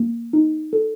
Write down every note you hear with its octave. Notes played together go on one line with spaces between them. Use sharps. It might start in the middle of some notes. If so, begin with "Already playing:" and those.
Already playing: A#3
D#4
A4